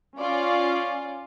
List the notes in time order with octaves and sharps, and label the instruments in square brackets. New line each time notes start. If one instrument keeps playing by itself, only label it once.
[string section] C#4 F4 D5